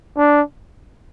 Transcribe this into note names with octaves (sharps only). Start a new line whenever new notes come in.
D4